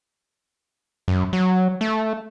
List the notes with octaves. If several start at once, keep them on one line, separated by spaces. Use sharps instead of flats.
F#2
F#3
A3